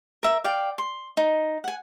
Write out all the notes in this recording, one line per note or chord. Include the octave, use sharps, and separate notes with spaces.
A#4 E5
D5 F5 G5
C6
D#4
F#5 G#5